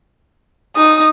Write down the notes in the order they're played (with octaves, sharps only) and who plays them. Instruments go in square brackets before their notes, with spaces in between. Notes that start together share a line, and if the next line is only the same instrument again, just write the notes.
[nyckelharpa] D#4 [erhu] D#6